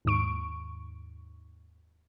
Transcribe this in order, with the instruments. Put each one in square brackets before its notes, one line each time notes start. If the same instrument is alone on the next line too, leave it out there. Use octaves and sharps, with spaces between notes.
[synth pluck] D#2 G#2 C#6 D7